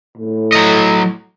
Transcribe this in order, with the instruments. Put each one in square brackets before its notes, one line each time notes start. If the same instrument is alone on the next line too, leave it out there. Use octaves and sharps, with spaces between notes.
[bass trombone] A2
[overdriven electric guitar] F#3 D#5